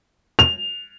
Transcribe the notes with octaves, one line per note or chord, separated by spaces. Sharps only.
F7